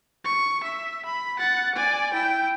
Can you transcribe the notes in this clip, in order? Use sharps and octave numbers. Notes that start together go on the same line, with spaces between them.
C#6
E5
B5
F#5 A6
D5 G#5
E4 G5